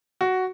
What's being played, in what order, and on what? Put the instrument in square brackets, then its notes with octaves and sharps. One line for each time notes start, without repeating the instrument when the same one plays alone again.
[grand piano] F#4